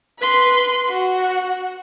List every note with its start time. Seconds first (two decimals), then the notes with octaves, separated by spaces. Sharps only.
0.19 B4 C6
0.89 F#4